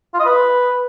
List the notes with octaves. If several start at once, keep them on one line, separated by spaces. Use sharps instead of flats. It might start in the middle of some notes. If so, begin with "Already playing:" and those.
F4
D#5
B4